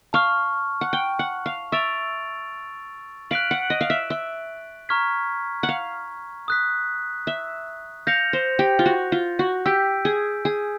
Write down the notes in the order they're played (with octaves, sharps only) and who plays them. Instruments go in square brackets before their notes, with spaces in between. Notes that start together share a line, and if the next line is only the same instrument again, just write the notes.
[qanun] F5 [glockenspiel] A5 C#6 F6
[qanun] F#5
G5
F#5
F5
[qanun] E5 [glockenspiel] C#6 E6 A6 D7 F7
[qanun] F5 [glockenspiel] F#6 B6 D7 F#7
[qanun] F#5
D#5
F5
E5
E5
[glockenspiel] A#5 C#6 F6 G#6 B6
[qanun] F#5
F5
[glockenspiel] D#6 F#6 B6
[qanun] E5
[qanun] F5 [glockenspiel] G6 A#6 C#7 F7
[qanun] C5
G4
F4
F#4
F4
F#4
[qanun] G4 [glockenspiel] E6 G6 B6 D7
[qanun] G#4
G#4